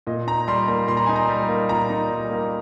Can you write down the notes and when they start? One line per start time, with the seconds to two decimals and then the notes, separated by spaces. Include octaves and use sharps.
0.07 A#2 D#5
0.27 D#4 A#5
0.48 G3 C6
0.68 A#3 A#5
0.88 A#2 C6
0.97 A#5
1.06 D#4 G#5
1.16 A#5
1.29 G3
1.48 A#3
1.69 A#2 A#5
1.90 D#4
2.10 G3
2.30 A#3